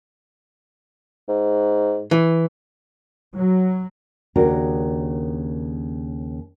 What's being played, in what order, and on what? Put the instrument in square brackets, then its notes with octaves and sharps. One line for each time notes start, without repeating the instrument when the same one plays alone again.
[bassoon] G#2
[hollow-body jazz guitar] E3
[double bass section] F#3
[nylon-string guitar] D#2 C#3 D4 F#4 A#4